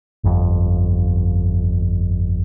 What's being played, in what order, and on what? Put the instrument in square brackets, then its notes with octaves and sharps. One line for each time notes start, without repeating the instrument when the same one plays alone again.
[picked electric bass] G1 F2